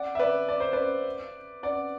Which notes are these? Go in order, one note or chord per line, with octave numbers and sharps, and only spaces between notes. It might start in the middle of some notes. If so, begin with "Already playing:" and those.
Already playing: D5 F#5
E5
B4 D5
D5
C5
B4 D5
D5 F#5